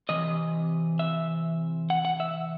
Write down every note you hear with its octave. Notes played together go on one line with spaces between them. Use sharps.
C3 E3 D#5
E5
F#5
F#5
E5